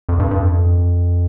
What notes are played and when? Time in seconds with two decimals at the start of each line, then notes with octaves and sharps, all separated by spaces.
0.09 F2
0.19 G2
0.31 G2
0.42 F2